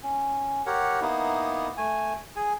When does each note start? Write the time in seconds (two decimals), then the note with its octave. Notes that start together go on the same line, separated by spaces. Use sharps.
0.03 C#4
0.66 G4 A#4 C#5 F#5
1.01 A#3 B3 D#4 E4
1.77 A3 G#5
2.36 G#4 G#5